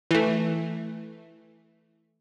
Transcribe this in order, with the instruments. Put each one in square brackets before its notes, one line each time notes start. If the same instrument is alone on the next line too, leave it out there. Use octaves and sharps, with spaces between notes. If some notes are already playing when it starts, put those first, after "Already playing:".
[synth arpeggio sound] E3 A3